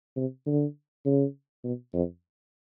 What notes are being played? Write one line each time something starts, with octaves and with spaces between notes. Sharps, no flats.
C3
D3
C#3
B2
F2